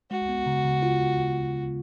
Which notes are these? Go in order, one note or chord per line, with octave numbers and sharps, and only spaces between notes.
G#3 F#4
B3
C#3
C#3
F4